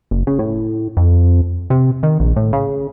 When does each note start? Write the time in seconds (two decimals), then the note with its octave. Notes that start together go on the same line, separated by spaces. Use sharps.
0.11 F#1
0.27 C#3
0.39 A2
0.97 F2
1.70 C3
2.03 D#3
2.20 A#1
2.36 A2
2.53 C#3